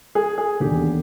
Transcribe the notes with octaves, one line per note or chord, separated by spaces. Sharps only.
G#4
G#4
E1 D#2 D3 G4